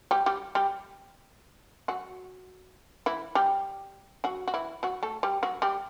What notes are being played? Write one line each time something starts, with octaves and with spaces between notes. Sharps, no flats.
G3 G4
G3 G4
G3 G4
F#3 F#4
E3 E4
G3 G4
F#3 F#4
F#4
E3 E4
F#3 F#4
A3 A4
G3 G4
F#3 F#4
G3 G4